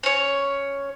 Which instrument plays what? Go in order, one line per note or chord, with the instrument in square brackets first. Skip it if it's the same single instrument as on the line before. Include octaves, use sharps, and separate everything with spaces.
[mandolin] C#4 C#5